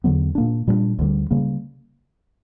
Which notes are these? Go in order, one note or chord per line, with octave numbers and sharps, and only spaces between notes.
E2 D3 F#3 B3
A#2 A#3 D4
A#2 G3 B3 D4
D2 D3 G3
C#3 G3 A#3